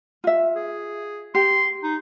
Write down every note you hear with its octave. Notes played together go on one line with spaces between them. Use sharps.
F4 E5
G#4
G4 C6
D#4